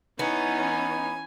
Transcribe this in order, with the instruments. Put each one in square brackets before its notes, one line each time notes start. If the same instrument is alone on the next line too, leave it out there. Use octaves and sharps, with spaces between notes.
[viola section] E3 C#4 C#5 [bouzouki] B3 [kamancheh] D#4 [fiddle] G#5